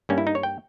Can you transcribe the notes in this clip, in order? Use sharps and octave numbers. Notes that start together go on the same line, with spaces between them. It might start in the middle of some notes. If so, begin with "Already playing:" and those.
G2 G3 A#3 C#4
E4
D#4
C#5
G5